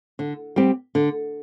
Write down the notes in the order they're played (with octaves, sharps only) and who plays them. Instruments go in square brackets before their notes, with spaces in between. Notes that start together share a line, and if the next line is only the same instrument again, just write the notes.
[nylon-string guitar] D3
G3 C4 G4
D3